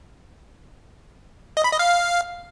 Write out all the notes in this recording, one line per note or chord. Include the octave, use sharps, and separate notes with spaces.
D#5
B5
D#5
F5